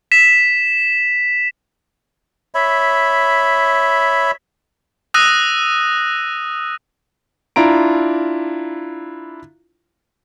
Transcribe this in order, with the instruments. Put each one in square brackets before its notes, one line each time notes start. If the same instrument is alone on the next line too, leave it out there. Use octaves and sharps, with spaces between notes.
[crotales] B6 E7
[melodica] C#5 E5 B5
[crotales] D#6 E6 F#6 A#6 D#7
[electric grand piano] D4 E4 F4 A#5 D7